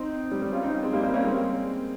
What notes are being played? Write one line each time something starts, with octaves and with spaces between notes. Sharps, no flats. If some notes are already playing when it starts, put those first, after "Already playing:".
Already playing: C4 D#4
G3
G3
C#4 F4
C4 D#4
G#3 C4
G3 A#3
G3 A#3
A#3 C#4
G#3 C4